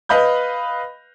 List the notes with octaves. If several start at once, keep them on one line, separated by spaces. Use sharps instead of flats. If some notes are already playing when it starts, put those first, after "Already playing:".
B4 D#5 F5 B5 G6